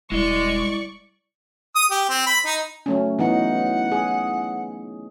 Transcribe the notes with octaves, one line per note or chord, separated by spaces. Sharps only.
E1 G3 G#3 E4 D5 D#5 C#6
D#6
G4
C4
B5
D#4
F#3 A3 C#4
E3 B3 D#4 F#5
G#4